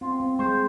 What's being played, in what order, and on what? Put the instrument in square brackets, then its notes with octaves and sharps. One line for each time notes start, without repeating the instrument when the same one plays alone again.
[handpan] C4 [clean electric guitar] F4
[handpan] C4
[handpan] G#3 [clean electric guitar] C5